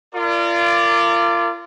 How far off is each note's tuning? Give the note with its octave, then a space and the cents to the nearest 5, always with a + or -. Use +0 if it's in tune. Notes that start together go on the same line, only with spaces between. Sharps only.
F4 -30 A#4 -30 D5 +0